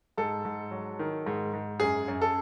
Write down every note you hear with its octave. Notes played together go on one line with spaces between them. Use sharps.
G#2 A4
G#2
F#3
D#3
G#2
G#2
F#2 G#4
F#2
A4